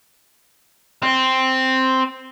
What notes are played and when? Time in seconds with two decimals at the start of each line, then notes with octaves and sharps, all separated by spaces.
1.03 C4